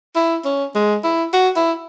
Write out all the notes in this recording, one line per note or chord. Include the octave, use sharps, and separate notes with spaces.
E4
C#4
G#3
E4
F#4
E4